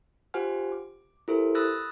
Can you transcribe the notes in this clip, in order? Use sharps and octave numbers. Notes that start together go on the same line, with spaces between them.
F4 G4 C5 F#5 G#5 F6
D6
E4 G4 A4 A#4 C5
B5 D#6 E6 F#6 A6 A#6